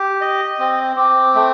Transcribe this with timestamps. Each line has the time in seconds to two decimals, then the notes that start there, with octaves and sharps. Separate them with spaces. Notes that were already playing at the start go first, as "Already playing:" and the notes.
Already playing: G4
0.21 D#5
0.59 C4
0.96 C4 D6
1.35 A3